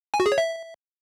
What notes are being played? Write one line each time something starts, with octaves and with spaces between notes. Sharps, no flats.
G#5
F#4
G#4
C#5
E5